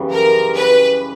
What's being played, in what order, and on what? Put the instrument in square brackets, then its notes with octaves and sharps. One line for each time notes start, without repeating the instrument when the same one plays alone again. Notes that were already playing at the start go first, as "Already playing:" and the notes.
Already playing: [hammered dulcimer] F#2 C#3 E3 G3
[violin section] A#4
B4